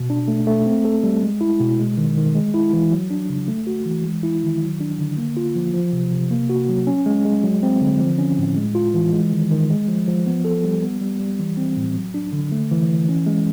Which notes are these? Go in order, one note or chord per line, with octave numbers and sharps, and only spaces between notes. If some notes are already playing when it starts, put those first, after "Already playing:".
Already playing: B2
D4
A3
A3
C4
A4
G3
G#3
E4
B2
G#3
D#3
D#3
G#3
E4
E3
F#3
D4
C#3
A3
F#4
E3
G#3
E4
D#3
F#3
D4
D3
A#3
F4
F3
F3
C3
C3
A#3
F#4
F#3
C#4
G#3
G#3
F#3
C4
D3
F3
C#4
A2
G#3
F4
E3
G#3
D#3
D#3
G#3
F3
F3
B3
A4
G3
B3
G3
G3
E3
C4
A2
F#3
D4
D3
A3
E3
E3
C#4
G#3